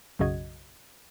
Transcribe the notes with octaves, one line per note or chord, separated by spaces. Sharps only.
B1 F#2 C#3 F#4 D#5 G#6